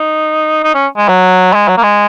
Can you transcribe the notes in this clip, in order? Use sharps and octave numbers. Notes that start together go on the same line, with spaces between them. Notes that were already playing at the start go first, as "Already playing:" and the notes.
Already playing: D#4
D#4
C#4
G#3
F#3
G#3
F#3
A#3
G#3